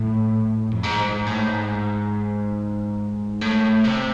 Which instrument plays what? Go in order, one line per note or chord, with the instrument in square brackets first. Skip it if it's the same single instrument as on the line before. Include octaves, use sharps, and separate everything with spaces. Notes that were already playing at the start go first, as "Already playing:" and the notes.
Already playing: [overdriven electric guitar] A2
F2
G#2
G#2
A2
G#2
A2
C3